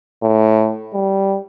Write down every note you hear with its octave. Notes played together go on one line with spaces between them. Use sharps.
A2
G3